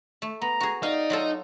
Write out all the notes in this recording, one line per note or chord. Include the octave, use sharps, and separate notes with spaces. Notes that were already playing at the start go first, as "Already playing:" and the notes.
A3
B3 A#5
F#4 G#4
D#4 D5 F5
F#3 F4 A4